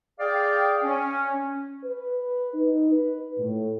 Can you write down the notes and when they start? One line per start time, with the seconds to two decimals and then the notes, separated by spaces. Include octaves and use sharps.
0.20 G#4 D5 F5 G5
0.84 C#4
1.84 B4
2.53 D#4
2.91 B4
3.38 A2